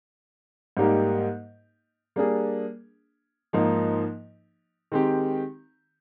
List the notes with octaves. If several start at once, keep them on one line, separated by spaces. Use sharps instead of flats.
G#2 G3 A#3 D#4 G4
G3 A#3 D4 G#4
G#2 F3 A#3 D#4
D#3 G#3 C4 G4